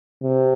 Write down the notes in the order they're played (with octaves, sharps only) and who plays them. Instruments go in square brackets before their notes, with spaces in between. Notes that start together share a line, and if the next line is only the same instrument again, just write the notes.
[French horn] C3